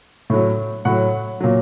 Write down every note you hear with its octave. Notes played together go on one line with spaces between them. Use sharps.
A2 F#3
A2 F#3 F#5
A#2 F#3